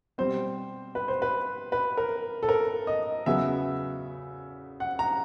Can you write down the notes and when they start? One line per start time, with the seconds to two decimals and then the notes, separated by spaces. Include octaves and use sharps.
0.18 B2 G3 C4 C5
0.95 B4
1.08 C5
1.22 B4
1.72 B4
1.97 A#4
2.43 A4
2.49 A#4
2.87 D#5
3.26 E2 C#3 F#3 B3 E5
4.80 F#5
4.99 A#5